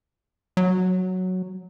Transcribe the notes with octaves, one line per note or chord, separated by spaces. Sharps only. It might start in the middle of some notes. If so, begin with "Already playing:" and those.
F#3